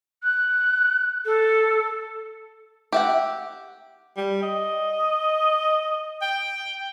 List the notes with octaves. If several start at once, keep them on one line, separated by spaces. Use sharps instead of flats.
F#6
A4
G4 E5 F#5
G3
D#5
G5